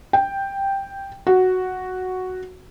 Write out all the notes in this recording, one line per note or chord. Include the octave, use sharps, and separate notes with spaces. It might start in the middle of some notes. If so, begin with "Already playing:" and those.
G5
F#4